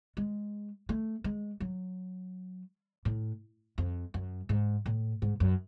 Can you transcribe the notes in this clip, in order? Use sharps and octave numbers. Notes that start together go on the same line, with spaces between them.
G#3
A3
G#3
F#3
A2
F2
F#2
G#2
A2
G#2
F#2